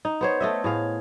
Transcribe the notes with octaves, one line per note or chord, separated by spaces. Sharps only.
D#4
B3 C5 C#5
A3 D#5 E5
A2 G#4 F5